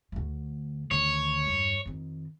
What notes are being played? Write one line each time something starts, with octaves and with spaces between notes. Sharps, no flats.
D2 A3
D2 D#3 C#5
E2 G2
F2 D#3